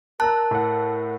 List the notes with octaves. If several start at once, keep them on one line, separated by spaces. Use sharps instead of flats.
A#4 A5 A#5 E6 F#6
A2 F#5